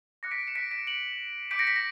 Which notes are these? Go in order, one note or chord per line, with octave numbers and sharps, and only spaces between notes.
D6 F#6 A#6 C#7
B6 D7
C#7 E7
B6 D7
B6 D7
D7 F#7
D6 G6 B6 D7
A#6 C#7
B6
A#6